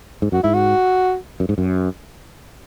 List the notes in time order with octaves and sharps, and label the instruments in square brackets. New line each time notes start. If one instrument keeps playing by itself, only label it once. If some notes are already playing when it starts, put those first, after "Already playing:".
[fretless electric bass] G#2
[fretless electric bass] F#2 [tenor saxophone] F#4
[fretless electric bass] G#2 [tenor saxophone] E4
[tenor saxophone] F#4
[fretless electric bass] F#2
G#2
F#2